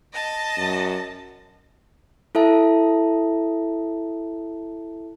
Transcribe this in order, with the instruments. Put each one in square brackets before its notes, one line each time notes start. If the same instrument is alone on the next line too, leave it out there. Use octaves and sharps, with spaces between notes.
[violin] D#5 A5
[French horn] F#2
[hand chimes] E4 A4 E5 A5